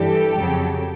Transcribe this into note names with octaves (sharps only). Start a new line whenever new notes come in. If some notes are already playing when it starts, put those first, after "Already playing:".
Already playing: G2 E3 G3 G4 A4
F2 C#3 F#3